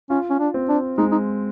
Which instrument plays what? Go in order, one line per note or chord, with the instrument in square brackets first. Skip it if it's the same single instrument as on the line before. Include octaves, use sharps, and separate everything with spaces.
[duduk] C#4 [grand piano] F4
[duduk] C#4
D4
[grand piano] C4
[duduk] D4
[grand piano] G#3 [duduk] D#4
[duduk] D#4